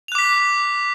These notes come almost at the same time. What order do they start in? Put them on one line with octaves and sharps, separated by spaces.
F7 F#6 D6 B6